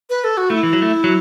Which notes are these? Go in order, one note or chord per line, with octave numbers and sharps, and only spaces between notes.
B4
A4
F#4
A3 E4
E3
F#3
A3
F#3